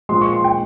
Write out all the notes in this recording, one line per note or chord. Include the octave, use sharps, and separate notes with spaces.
A#2 F3 G#3 C6
C#6
C6
G5